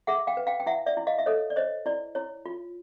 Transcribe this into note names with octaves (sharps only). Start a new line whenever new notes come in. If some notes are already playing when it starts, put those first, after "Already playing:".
G#4 E5 F#5
F5 G5
B4
F5 G5
G5
E4 E5 F#5
D5 E5
E4
D#5 F5
E5
A4 C#5 D#5
D5
C5 C#5 D#5
E4 D5
E4 C#5
F4